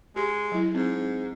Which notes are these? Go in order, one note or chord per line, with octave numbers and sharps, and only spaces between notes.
G#3 G4
F#3 E4
G#2 C4